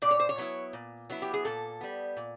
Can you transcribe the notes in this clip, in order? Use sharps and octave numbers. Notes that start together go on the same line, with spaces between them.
A#2 D5
C#5
C5
C#5
F#3 B3 E4
A#2
F#3 B3 E4
G4
G#4
A#2 A4
G3 B3
A#2